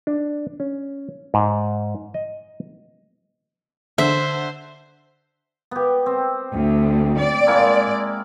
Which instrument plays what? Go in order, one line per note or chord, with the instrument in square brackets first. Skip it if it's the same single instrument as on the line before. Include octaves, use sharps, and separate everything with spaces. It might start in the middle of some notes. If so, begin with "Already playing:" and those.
[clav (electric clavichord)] D4
C#4
G#2
D#5
[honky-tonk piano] D3 [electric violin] C5 [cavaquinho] E5
[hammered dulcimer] B3 G4
C4
[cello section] D2
D5
[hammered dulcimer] G#3 A#3 E4